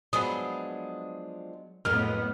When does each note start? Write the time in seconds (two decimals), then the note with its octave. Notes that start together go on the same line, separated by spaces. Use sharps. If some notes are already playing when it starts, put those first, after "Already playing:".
0.13 F3 F#3 G#3 B3 D4 D#6
1.85 F2 A2 F#3 G#3 A#3 B3 A#4 F6